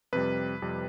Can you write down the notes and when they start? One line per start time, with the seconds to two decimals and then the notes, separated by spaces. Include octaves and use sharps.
0.13 F2 C3 G3 B4
0.62 F2 C3 G3